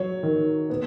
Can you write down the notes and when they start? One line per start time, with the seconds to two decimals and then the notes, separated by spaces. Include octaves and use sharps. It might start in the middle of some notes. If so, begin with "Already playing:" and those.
Already playing: F#3 C#5
0.23 D#3
0.70 B3